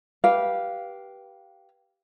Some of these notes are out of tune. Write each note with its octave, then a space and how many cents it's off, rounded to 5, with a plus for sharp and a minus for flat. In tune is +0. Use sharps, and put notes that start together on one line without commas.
G4 -10 B4 -20 F5 +0